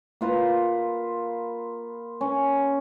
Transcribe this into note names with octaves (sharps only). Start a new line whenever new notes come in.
A#3 F4 B4 A#5
C#4